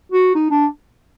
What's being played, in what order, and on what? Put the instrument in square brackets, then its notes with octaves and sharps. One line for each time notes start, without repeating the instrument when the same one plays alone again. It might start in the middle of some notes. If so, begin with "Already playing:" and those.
[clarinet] F#4
D#4
D4